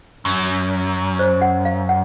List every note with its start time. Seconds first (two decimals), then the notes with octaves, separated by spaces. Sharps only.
0.25 F#2
1.19 C5
1.42 F#5
1.65 F5
1.89 F#5